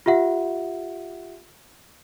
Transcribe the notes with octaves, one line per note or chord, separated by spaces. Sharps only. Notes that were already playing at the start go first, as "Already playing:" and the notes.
F4 G4 E5 F#5